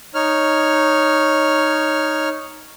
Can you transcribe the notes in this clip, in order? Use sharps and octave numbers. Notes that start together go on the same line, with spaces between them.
D#4 C#5 F6